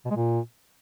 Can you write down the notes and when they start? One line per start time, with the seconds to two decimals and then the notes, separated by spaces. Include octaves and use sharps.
0.05 B2
0.10 G#3
0.16 A#2